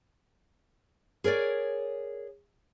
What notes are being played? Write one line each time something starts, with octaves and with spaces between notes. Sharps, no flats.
G#4 A#4 C#5 D5